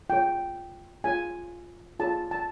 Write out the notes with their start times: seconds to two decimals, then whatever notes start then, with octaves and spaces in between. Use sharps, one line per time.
0.10 F4 G#4 C#5 G5
1.04 F4 G#4 C#5 G#5
1.99 F4 G#4 C#5 A5
2.31 A5